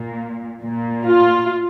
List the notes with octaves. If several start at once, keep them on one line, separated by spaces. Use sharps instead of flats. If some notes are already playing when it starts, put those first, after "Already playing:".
Already playing: A#2
A#2
F4